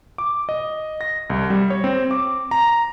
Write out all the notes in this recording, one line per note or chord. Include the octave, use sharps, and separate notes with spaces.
D6
D#5
A#6
C2
G3
C#5
C4
D6
A#5